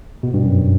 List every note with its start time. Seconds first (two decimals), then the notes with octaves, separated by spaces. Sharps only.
0.23 B2
0.34 G2
0.45 F#2